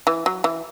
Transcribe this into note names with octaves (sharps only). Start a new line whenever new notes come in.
E3
F#3
E3